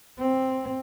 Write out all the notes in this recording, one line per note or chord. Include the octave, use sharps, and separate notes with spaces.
C4